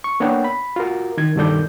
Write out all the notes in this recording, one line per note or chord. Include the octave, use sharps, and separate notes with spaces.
C#6
A#3 B3 D4 C#5 F#5 G5
B5
F4 F#4 A#4
D#3 G#6
G2 B2 D#3 A4 D5 G6